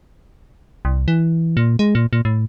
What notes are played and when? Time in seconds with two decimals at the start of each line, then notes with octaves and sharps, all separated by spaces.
0.85 C2
1.08 E3
1.57 A#2
1.79 G#3
1.95 A#2
2.13 A#2
2.25 A2